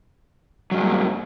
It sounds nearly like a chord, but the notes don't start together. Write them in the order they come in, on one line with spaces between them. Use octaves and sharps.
F#3 G2 G#3 B3 A#3